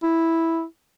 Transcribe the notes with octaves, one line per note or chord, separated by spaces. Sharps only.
E4